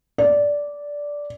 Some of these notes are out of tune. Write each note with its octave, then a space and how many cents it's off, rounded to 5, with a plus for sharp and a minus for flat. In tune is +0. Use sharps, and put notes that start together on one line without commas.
D5 -10